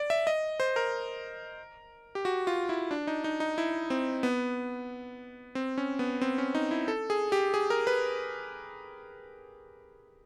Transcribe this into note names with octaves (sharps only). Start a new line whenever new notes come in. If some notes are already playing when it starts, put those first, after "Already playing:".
Already playing: D5
E5
D#5
C5
A#4
G4
F#4
F4
E4
D4
D#4
D#4
D#4
E4
C4
B3
C4
C#4
B3
C4
C#4
D#4
E4
A4
G#4
G4
G#4
A#4
B4